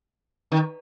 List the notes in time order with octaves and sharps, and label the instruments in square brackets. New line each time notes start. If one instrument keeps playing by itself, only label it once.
[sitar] D#3